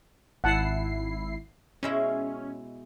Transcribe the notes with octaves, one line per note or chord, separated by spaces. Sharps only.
G#1 E4 F#5 A5 C7
B2 G#3 C#4 E4